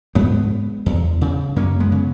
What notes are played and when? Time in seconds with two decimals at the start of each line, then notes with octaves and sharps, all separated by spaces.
0.15 G#2 G#3 B3
0.86 E2
1.21 C#3
1.56 F#2 A#3 C#4
1.80 G#3 B3
1.92 C#3